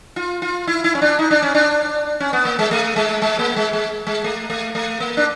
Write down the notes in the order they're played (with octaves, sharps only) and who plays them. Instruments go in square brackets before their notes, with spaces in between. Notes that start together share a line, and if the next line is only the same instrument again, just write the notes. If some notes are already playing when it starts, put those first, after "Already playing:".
[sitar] F4
F4
E4
E4
C#4
D4
D#4
D4
C#4
D4
C#4
B3
A#3
G#3
A3
G#3
G#3
A#3
G#3
G#3
G#3
A3
A3
A3
A#3
D4